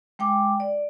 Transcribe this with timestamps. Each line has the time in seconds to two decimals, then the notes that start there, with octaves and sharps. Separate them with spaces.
0.19 G#3 G5 D6
0.60 D5